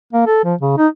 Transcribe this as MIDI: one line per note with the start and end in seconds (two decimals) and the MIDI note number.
0.13 0.25 58
0.27 0.41 69
0.44 0.55 53
0.61 0.73 49
0.78 0.88 63